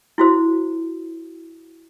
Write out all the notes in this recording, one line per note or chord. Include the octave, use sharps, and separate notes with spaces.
E4 F#4 C5